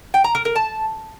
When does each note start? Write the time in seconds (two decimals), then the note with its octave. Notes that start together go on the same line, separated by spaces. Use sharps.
0.14 G5
0.24 A#5
0.35 A#4
0.45 A#4
0.56 A5